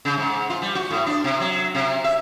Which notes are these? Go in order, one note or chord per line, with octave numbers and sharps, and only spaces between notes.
C#3
G#2
F4
G3
F#4
A2
D4
C3
F#3
C3
E5